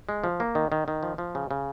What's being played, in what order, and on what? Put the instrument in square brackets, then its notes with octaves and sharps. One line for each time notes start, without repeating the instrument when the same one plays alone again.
[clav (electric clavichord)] G#3
F3
A#3
D#3
D#3
D#3
F3
F3
C#3
C#3